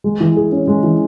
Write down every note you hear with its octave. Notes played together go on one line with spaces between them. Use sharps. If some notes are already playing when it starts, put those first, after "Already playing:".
G#3
E3
G#4
C#4
G#3
E3